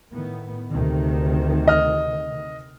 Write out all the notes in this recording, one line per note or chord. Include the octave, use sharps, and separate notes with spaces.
A2 D#3 B3
D2 C3 D#3
D#5 F6